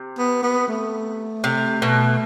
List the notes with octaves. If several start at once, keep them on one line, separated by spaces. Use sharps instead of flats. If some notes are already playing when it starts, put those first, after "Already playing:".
Already playing: C3
B3
B3
A3
C3
B2